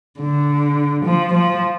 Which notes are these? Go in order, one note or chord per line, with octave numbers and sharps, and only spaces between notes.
D3
F3
F3